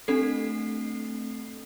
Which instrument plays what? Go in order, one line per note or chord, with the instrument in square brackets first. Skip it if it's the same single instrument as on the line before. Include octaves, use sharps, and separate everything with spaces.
[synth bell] A3 C4 D4 A4 C7